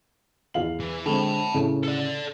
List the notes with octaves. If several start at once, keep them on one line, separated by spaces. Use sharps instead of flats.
E2 F5 F#7
E3
D3 G#3 C4 A5 B5
A2 C#3
A4 D5